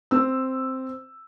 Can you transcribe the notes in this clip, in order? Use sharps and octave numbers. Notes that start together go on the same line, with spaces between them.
C4 E6